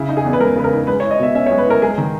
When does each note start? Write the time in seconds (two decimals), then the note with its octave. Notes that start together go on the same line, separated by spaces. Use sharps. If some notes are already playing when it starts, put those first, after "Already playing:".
Already playing: C#3 E4
0.09 D#4
0.17 G#4
0.25 E2
0.33 B4
0.40 G#3 A#4
0.56 C#3 B4
0.64 A#4
0.73 D#4
0.87 G#3 B4
1.00 C#5
1.03 E4
1.11 D#5
1.19 B2 E5
1.35 C#4 E5
1.46 C#5
1.51 G#3
1.58 B4
1.67 E4 A#4
1.82 G#3 G#4
1.98 D#3